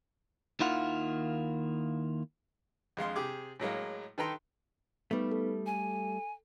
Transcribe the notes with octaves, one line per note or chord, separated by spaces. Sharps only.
D#2 D#3 A#3 E4 F4 F#5
F2 G#3 F5 C6
C3 G4 G#4 D6
A2 F#3 G#3 A#3
D#3 A4 B4 G5 A#5 C6
G3 A3 B3 D#4 B4
A4
G#5